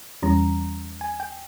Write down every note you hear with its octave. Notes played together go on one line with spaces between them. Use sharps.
E2 E3 G3 C#4 A#5
G#5
G5